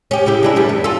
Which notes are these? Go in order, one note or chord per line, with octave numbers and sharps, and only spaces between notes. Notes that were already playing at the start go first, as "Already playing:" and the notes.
C#4 G4
C#3 E4 G4
G#3 D4 E4
F#2 G3 B3
E2
F4 A4